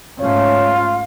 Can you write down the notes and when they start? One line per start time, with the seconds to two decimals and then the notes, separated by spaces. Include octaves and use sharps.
0.20 G#2 A3 C#4 F4 C#5 F5